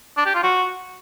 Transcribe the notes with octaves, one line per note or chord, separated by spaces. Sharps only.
D4
G4
F4
F#4